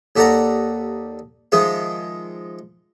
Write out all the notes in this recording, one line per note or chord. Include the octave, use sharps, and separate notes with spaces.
D#2 G4 A4 D5 F#5 A#5
D#3 F3 G#3 G#4 E5